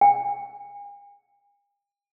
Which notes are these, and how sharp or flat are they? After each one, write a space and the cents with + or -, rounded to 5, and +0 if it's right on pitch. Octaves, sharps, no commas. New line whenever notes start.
G#5 -45